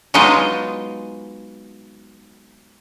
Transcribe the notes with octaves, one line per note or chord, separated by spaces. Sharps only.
F#3 G#3 B3 D#4 F4 D#5